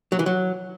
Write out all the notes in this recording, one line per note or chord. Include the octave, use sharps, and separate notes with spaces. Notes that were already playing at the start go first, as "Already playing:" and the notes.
F#3
E3
F#3